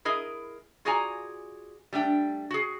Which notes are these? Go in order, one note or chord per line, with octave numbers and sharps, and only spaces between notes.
E4 G#4 A#4 D#5
F4 F#4 G#4 D5 G#5 A#5
G3 A3 D4 G5
F#4 G#4